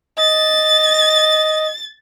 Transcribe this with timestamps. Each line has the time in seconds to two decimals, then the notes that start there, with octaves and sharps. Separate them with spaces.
0.19 D#5 A6